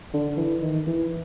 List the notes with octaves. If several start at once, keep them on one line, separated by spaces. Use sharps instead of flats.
D3
E3
D#3
E3